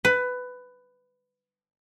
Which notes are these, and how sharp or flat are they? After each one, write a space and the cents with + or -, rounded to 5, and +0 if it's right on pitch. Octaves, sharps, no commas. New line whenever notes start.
B4 +15